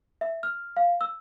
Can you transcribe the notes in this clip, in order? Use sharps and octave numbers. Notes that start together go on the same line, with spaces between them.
E5
F6
F5
E6